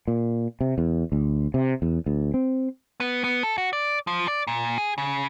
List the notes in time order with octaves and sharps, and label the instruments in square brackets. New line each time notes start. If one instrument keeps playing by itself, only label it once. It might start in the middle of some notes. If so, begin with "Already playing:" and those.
[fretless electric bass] A#2
C3
E2
D2
C3
E2
D2
C4
[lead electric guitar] B3
B3
A4
F#4
D5
F3
D5
A#2
G#4
C#3